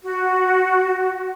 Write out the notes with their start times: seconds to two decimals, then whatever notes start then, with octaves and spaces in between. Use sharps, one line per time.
0.03 F#4